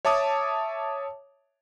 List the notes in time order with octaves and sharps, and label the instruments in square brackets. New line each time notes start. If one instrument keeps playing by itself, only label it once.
[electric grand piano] C#5 E5 A5 D6 D#6